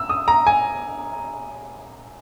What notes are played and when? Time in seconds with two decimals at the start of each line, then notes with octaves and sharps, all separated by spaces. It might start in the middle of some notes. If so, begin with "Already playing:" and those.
Already playing: E6
0.09 D#6
0.28 A#5
0.47 G#5